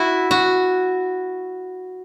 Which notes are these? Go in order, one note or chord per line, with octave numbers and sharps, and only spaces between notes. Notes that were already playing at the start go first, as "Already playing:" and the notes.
Already playing: E4 F#4
F#4